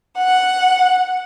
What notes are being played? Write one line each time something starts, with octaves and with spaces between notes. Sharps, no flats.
F#5